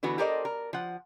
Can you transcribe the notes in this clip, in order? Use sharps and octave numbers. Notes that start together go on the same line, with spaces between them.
D3 E3 B3 F#4
G4 A4 A#4 C5 D5 D#5
A#4
F3 F#5